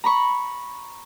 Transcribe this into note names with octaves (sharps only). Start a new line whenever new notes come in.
A#5 B5 C#6